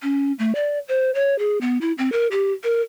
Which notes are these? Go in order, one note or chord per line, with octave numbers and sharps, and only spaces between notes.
C#4
A3
D5
C5
C#5
G#4
B3
E4
C4
A#4
G4
A#4